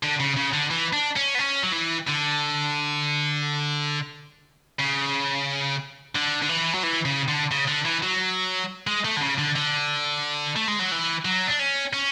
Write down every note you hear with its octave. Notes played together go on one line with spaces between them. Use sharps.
D3
C#3
C#3
D3
E3
D4
C#4
B3
C#4
F#3
E3
D3
C#3
D3
D3
E3
F#3
E3
C#3
D3
C#3
D3
E3
F#3
G#3
A3
D3
C#3
D3
D3
A3
G#3
F#3
E3
F#3
D4
C#4
C#4